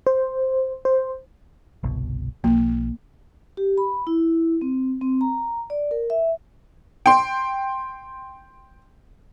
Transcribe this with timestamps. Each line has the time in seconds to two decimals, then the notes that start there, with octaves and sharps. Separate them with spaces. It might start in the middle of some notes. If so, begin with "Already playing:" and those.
0.07 C5
0.85 C5
1.83 G1 C2 B2
2.44 B1 F3 A#3
3.57 G4
3.78 B5
4.07 E4
4.61 C4
5.01 C4
5.21 A#5
5.70 D5
5.91 A#4
6.10 E5
7.06 G5 C6